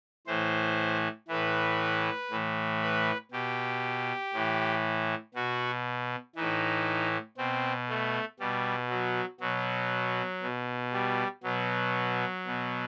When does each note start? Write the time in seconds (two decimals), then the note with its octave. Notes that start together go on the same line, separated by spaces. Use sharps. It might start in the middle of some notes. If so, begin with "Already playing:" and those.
0.27 A2 E3 C5
1.28 A2 E3 B4
2.31 A2 E3
2.82 B4
3.31 B2 G4
4.34 A2 E3
5.34 B2 F#4
6.36 A2 E3 D#4
7.37 B2 C4
7.89 A3
8.40 B2 G3
8.90 F#3
9.40 B2 F#3
10.42 B2
10.93 G3
11.43 B2 F#3
12.46 B2